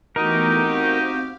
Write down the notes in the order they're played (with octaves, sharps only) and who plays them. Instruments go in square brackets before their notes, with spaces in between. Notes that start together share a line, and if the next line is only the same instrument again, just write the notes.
[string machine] E3 A3 B3 [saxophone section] D#4 [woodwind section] F#4 G4 [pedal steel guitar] A#4
[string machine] C4 F5